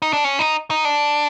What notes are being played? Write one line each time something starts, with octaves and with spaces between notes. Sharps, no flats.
D#4
D4
C#4
D#4
D#4
D4